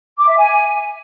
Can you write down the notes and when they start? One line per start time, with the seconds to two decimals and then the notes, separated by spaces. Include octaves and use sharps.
0.18 D6
0.28 E5
0.37 G#5